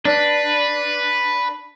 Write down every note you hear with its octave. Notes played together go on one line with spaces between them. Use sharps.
D4 B4